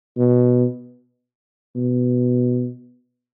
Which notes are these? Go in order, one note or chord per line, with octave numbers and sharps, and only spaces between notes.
B2
B2